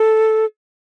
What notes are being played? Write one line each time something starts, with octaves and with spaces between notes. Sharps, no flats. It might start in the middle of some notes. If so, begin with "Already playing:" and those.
Already playing: A4